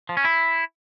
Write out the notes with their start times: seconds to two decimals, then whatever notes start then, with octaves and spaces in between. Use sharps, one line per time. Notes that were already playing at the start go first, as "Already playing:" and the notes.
0.09 F3
0.17 C#4
0.25 E4